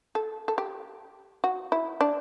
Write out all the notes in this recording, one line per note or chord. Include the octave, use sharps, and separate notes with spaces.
A4
A4
G4
F#4
E4
D4